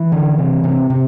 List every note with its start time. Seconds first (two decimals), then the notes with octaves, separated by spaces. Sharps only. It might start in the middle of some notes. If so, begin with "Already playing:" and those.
Already playing: E3
0.12 D3
0.38 C3
0.64 C3
0.90 C3